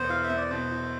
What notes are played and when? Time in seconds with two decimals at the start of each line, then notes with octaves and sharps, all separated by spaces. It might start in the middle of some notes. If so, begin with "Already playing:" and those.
Already playing: E1 B3 C5
0.09 E4 F5
0.23 E5
0.30 B3
0.37 D5
0.50 B2 C5
0.71 E4